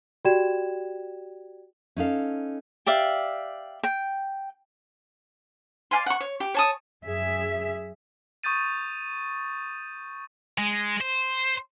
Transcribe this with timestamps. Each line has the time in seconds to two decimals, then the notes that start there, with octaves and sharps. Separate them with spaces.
0.25 F#4 G4 D5 G5 G#6 E7
1.96 C#4 D#4 A4 F5
2.86 G4 D5 E5 F5
3.83 G5
5.91 D5 F5 G#5 C6
6.06 F#5 C#6
6.20 C#5
6.40 G4
6.54 C#5 A5 D#6
7.05 F#2 G#4 E5
8.44 C#6 D#6 G6 A6 D#7
10.58 G#3
11.01 C5